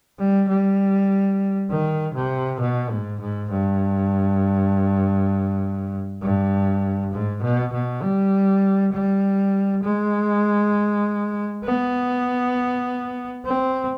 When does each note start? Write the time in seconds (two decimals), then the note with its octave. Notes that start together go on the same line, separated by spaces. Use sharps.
0.19 G3
0.49 G3
1.70 D#3
2.14 C3
2.60 B2
2.91 G#2
3.21 G#2
3.51 G2
6.22 G2
7.12 G#2
7.42 B2
7.73 B2
8.03 G3
8.93 G3
9.83 G#3
11.65 B3
13.46 C4